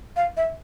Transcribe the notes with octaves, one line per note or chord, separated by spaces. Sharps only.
F5
E5